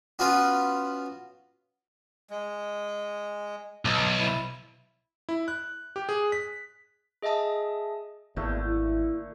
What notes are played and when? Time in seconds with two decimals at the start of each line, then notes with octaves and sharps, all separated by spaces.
0.19 B3 C#4 F4 F#4 B4
2.30 G#3
3.85 B1
4.19 E4
5.29 E4
5.48 F#6
5.96 G4
6.09 G#4
6.32 B6
7.22 G#4 D#5 E5 A5 D#6
8.36 G#1 E2 A#2 D3 A3
8.65 E4